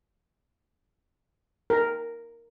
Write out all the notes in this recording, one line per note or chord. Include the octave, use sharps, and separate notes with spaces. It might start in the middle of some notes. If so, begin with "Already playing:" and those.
A#4